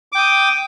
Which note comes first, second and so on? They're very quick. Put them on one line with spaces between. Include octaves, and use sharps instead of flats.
D6 G5 D#6